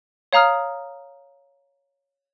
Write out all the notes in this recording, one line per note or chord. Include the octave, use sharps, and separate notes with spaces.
C#5 F5 A#5 D#6 F6